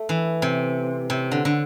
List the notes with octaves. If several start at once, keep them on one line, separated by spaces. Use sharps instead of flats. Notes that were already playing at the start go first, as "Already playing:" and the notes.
Already playing: A3
E3
C3
C3
D3
D3